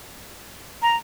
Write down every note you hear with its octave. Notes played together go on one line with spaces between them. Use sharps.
A#5